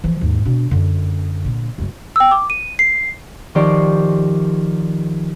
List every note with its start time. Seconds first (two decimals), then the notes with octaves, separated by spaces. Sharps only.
0.04 E3 F3
0.21 D#2 G#2
0.45 B2 D4
0.71 F#2 D3
1.44 A#2 D3
1.78 F#1 F#2
2.16 G5 E6
2.31 D6
2.50 D#7
2.79 C7
3.55 D#3 F3 G4 C5 D5 C#6